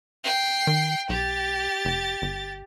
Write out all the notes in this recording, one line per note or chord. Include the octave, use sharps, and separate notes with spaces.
G5 C7
D#3
B1 G4 A6
F1
G1